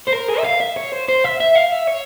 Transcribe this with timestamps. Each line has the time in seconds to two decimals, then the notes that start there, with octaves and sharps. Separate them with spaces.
0.08 C5
0.13 A#4
0.29 G#4
0.39 E5
0.45 F5
0.61 E5
0.77 C#5
0.92 C5
1.08 C5
1.24 E5
1.40 E5
1.55 F5
1.72 E5
1.87 C#5